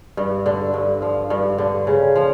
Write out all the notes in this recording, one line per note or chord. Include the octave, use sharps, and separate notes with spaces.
G2
D3
G2
F3
G2
D3
C#3
F3